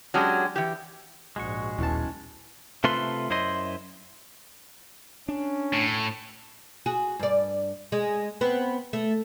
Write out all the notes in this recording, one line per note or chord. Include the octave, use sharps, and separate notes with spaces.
F#3 G#3 C#4 D4 G4
E3 G4
A#1 G#2 G#3 F#4 C#6
D#1 B1 E2 C#4 A5
C3 A3 F4 A4 B4 C6
F#2 E4 C5 D#5 C6
C#4 D4
A2
F#4 G#4
G2 D5
G#3
B3 C4
A3